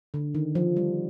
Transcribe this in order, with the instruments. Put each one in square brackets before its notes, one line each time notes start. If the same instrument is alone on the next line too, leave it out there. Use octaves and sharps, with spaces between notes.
[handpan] D3
D#3
F3
G3